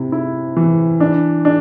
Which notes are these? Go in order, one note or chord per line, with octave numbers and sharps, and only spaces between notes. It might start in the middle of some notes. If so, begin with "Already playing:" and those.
Already playing: C3 E4
E4
E3
D4
D4